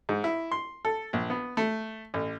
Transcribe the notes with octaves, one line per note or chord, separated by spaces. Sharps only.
G#2
E4
C6
A4
A#1
B3
A3
A1